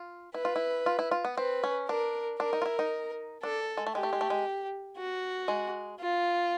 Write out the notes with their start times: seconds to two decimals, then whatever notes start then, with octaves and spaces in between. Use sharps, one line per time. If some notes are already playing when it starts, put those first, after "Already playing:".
Already playing: F4
0.34 E4 B4
0.45 F4
0.56 E4
0.86 F4
0.99 E4
1.11 F4
1.25 B3
1.37 C4 B4
1.64 C#4
1.89 D4 A#4
2.39 D4 A#4
2.53 D#4
2.62 F4
2.66 E4
2.79 D#4
3.43 D4 A4
3.77 G#3
3.87 A3
3.95 G#3 G4
4.03 A3
4.13 G#3
4.21 A3
4.30 G#3
4.97 F#4
5.48 G#3
6.00 F4